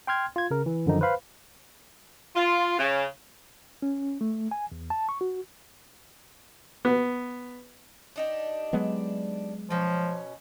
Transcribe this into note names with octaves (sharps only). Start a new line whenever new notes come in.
G5 C6 F6 G#6
F4 G#6
C#3 A#4
E3
F#2 D3 D#3 F3 D#4
B4 C5 F5 B5
F4
C#3
C#4
A3
G#5
E2
A5
C#6
F#4
B3
D4 D#4 G4
F#3 G#3 B3
B2 F3 C#4